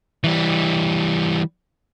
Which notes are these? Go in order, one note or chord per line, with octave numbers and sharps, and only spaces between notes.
E3 G3